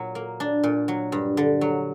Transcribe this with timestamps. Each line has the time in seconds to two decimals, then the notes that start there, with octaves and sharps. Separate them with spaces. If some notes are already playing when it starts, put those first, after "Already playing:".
Already playing: A#2 F#3
0.15 A#3
0.40 D4
0.63 A#2
0.88 F#3
1.12 G2
1.37 D3
1.61 F#3